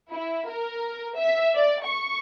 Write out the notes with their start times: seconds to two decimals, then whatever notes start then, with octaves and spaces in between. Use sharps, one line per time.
0.11 E4
0.49 A#4
1.18 E5
1.56 D5
1.85 C#6